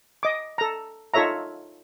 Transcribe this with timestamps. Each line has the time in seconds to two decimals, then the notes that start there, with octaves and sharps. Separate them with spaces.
0.23 D#5 D6
0.58 A4 A#5
1.14 D#4 F4 A4 C#5 E5 A#5